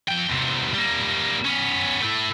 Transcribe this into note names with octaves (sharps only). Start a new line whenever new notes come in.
F3 G5
E2 C3
G3 A#3
B3 C#4
A3 E4